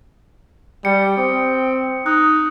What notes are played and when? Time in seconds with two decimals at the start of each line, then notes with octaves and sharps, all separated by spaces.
0.85 G3 G5 C#7
1.17 C4 D#6
2.06 D#4 D#6 F#6